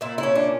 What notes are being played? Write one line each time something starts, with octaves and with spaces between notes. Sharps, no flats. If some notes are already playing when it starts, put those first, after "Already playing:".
A#2 E4
E4
C#4
D4